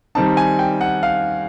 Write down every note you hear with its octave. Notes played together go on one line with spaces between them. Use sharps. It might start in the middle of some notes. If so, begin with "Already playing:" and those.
D#3 G3 C4 D#4 A5
G#5
G5
F#5
F5